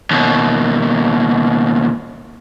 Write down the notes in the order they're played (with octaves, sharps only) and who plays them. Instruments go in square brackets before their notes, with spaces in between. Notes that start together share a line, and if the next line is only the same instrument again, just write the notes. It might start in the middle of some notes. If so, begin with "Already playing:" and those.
[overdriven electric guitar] D#2 B2